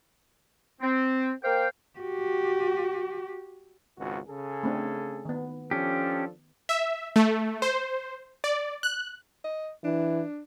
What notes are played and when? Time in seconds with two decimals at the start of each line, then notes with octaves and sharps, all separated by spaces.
0.81 C4
1.43 A#3 A#4 C5 F5 G5
1.99 F#4 G4
3.98 G#1 C#2 F#4
4.28 C#3 G#4 A4
4.63 A3 C4 D4
5.25 D#3 B3
5.71 F3 C#4 D4 G4 A4
6.69 E5
7.16 A3
7.62 C5
8.44 D5
8.83 F#6
9.44 D#5
9.84 E3 D4